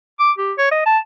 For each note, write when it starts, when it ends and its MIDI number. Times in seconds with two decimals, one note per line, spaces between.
0.20 0.31 86
0.38 0.53 67
0.58 0.71 73
0.71 0.81 75
0.86 0.98 81